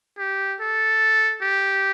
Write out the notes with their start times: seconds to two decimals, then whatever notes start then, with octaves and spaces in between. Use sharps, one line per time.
0.18 G4
0.60 A4
1.42 G4